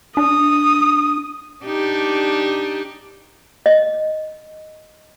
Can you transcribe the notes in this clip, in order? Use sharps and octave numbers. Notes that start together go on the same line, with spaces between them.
D4 D#6
D4 D#4 G4
D#5